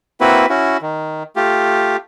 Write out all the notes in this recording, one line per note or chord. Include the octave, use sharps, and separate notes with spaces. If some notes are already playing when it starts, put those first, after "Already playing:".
A#3 C4 E4 F#4 B4
C#4 E4 F#4
D#3
A3 F4 G4